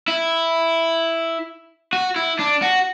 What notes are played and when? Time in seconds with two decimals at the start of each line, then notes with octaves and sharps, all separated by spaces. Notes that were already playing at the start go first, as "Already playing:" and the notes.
0.08 E4
1.93 F#4
2.16 E4
2.39 D4
2.62 F#4